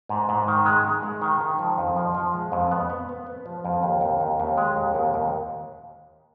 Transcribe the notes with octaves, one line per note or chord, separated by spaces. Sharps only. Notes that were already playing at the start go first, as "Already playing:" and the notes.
G#2
G#2
D#3
G#3
G#3
G#3
D#3
D#3
F3
F2
F3
F3
G#3
F2
B3
B3
B3
B3
F3
F2
D#2
D#2
D#2
D#2
G#3
D#2
D#2
D#2